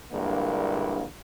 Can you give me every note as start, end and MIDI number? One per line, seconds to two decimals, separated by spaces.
0.12 1.04 34
0.12 1.04 43
0.12 1.04 50
0.12 1.04 56
0.12 1.04 58
0.12 1.04 64